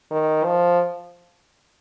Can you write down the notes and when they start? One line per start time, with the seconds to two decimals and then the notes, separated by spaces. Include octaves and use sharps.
0.11 D#3
0.45 F3